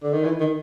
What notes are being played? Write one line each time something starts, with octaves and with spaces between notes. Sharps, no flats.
D3
D#3
E3
D#3